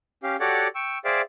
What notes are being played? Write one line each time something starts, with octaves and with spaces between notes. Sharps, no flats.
C#4 G4 F5
F#4 G4 A4 C#5 D5 F#5
G5 C#6 E6
G#4 C5 D5 E5 F5 G5